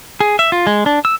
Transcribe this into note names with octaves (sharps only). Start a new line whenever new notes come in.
G#4
E5
F4
G#3
D4
E6